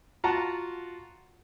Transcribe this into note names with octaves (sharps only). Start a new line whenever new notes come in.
F4 F#4 F#5 A5 A#5